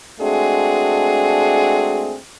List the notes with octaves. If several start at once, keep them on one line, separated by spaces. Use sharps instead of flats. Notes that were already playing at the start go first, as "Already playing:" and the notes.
G#3 A3 C4 D4 F#4 G#4